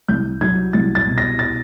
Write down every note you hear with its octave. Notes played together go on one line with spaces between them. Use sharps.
C2 G6
F#3 G#6
C2 A6
A6
B2
A#6
A6